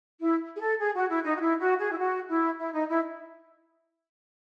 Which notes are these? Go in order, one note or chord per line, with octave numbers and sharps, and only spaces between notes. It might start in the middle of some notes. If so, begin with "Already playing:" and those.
E4
G#4
A4
G#4
F#4
E4
D#4
F#4
E4
F#4
G#4
E4
F#4
E4
E4
D#4
E4